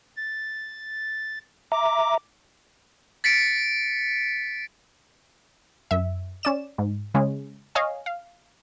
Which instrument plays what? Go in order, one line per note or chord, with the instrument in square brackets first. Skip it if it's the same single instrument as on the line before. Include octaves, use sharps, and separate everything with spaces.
[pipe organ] A6
[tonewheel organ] E5 A#5 [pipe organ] D6
[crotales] A6 B6 C#7 D7
[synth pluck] F#2 E5
C#4 D5 E7
G#2
C#3 G#3 C#4
C#5 D#5 F5 G#5
F5